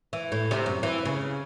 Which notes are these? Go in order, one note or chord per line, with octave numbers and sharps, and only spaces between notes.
E3
A2
C3
F#2
E3
C#3